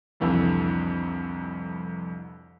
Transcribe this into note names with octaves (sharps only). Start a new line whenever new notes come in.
C2 F2 D3 E3 G3